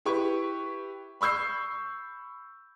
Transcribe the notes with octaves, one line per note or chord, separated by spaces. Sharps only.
E4 G4 B4 C#6
B5 C#6 E6 G6 C7